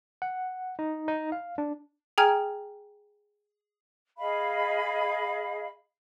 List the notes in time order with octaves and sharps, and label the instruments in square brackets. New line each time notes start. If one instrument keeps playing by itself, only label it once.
[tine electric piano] F#5
D#4
D#4
F5
D4
[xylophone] G#4 G5 G#5 A#5 F6 G#6
[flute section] G#4 D#5 F5 B5